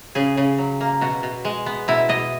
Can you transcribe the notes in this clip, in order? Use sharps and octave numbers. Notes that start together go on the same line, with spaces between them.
C#3 G#4
C#3
F#3
A#3
B2 F#4
B2
G#3
B3
B2 E4
B2 D#5